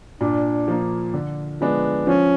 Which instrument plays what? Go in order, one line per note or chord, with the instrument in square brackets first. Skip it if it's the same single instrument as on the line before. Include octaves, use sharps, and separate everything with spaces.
[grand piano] A#2 [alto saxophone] D4
[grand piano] F3 A#3
D3
F3 G#3 B3 D4
[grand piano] F3 [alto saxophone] C#4